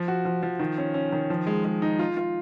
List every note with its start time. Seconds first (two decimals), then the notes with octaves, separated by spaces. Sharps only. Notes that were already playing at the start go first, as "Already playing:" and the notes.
Already playing: F3
0.08 F#4
0.25 F3
0.43 F3
0.59 D#3
0.78 C#4
0.94 C#4
1.12 D#3
1.30 F3
1.47 G#3
1.64 G#3
1.82 D#4
1.99 F4
2.17 F4